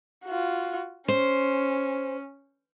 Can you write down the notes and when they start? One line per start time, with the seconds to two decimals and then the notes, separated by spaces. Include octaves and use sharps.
0.25 F4 F#4
1.08 C#4 C5